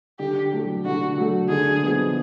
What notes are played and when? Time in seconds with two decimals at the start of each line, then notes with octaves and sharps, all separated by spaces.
0.19 D3 G4
0.52 F#3 A3
0.85 D3 F#4
1.17 F#3 A3
1.49 D3 G#4
1.83 F3 G#3 B3